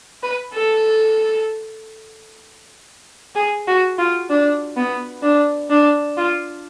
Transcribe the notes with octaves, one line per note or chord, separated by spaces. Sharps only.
B4
A4
G#4
F#4
F4
D4
B3
D4
D4
F4